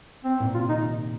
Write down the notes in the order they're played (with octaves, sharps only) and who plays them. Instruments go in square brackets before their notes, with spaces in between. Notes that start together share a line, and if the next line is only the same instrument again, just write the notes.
[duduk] C4
[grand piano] A#2
[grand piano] C3 [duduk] F4
[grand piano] D#3 [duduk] D#4